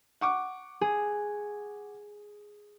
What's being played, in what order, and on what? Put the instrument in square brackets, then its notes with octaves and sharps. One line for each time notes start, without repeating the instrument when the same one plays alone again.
[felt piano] F#5 C#6 D6
[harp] G#4